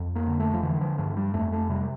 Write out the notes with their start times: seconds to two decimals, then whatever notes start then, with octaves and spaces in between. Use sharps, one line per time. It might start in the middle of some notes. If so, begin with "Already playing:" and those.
Already playing: F2
0.15 A#3
0.28 D3
0.39 A3
0.54 F3
0.63 D3 E3
0.81 F3
0.98 G2 F3
1.17 G3
1.34 F2 A3
1.52 A3
1.69 C3 G3